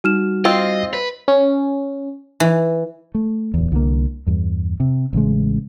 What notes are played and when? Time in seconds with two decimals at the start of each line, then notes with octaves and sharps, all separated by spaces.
0.04 G3 D#4 F#4 F6 E7
0.45 C4 F4 D#5
0.93 B4
1.28 C#4
2.40 E3
3.15 A3
3.54 D1 E2
3.72 C2 D3 E3 A#3
4.27 E2 G2
4.80 C3
5.13 A1 C#3 G#3